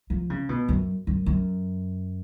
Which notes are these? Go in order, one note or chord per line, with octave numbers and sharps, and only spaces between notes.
F3
C#3
B2
F#2
F#2
F#2